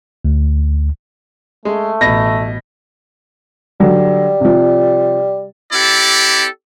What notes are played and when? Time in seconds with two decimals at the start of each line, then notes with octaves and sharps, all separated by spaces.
0.25 D2
1.65 G#3 A3
2.01 A1 B2 A#6
3.80 D3 F#3 G3
4.40 C3 F3
5.73 C4 E4 G4 A4 D5